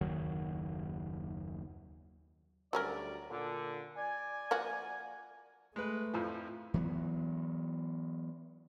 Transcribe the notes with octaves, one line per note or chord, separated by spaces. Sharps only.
F#1 D#2 D#3 F#3
D2 F#3 G3 C#4 A#4 D5
A#2 D3
D5 G#5
F3 A#3 F#4
G#3 A3 B4
F2 A2 F3
E3 F#3 A3 B3